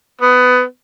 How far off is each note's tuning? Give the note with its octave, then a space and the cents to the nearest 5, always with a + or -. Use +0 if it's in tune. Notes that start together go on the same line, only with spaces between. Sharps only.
B3 +20